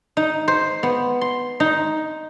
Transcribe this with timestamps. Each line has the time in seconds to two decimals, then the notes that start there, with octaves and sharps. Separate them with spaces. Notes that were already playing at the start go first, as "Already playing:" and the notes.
0.17 D#4
0.48 C5
0.83 B3
1.21 C6
1.60 D#4